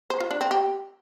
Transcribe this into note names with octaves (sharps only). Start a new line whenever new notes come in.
C5
F4
D4
C4
G4